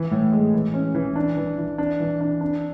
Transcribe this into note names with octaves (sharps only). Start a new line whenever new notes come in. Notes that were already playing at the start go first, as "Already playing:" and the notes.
Already playing: E3
A2
G#3
E3
C#4
E3
D4
E3
E3
D4
E3
D4
D4